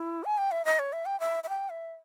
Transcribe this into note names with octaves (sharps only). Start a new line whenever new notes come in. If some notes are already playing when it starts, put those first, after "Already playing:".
Already playing: E4
G#5
G5
E5
D#5
C#5
E5
G5
E5
E5
G5
E5